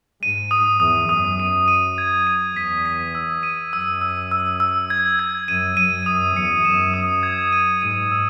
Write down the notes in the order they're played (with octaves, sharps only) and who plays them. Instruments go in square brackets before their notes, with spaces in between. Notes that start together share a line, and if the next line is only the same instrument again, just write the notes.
[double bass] G#2 [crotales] D#7
[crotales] D#6
[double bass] E2 [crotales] D#6
[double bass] F#2 [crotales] D#6
[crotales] D#7
D#7
G#6
D#7
[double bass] E2 [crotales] B6
[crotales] B6
E6
D#7
[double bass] F#2 [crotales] E6
[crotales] E6
E6
E6
G#6
G#6
[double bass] F#2 [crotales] D#7
[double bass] F#2 [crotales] D#7
[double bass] F#2 [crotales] D#6
[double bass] E2 [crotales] C#7
[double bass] F#2 [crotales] E7
[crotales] D#6
G#6
D#7
[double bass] G#2 [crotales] D#7
[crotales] E6